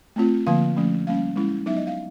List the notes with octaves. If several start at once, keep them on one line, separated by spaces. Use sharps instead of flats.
A3 C4 F4
D3 F3 A#3 F5
F3 A3 C#4
G3 A#3 C#4 F5
G#3 C#4 E4
F#3 B3 D#4 E5
D#5
F5